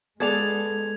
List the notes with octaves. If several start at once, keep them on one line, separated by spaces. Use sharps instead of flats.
G#3 B3 G#4 A4 D5 G#6 F7